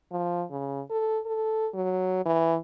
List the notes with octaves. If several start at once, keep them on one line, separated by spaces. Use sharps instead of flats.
F3
C#3
A4
A4
F#3
E3